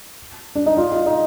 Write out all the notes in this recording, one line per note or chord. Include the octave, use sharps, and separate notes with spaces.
D4
D#4
F4
F4
D#4